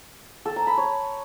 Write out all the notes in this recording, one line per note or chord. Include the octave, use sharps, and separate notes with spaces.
A4
A#5
B5
C#5